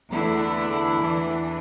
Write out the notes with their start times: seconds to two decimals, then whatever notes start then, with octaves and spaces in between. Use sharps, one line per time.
0.11 E2 D3 A3 D4 E4
1.00 E2 E3 D4